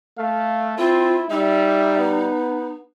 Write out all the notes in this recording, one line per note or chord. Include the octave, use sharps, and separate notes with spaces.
A3 F5
C4 E4 F4
G3 D#4 E5
B3